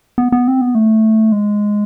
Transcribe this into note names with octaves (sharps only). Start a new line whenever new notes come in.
B3
B3
C4
B3
A3
G#3